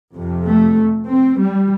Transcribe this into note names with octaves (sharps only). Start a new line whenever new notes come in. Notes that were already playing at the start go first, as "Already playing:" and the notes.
F2 C3
A3
C4
G3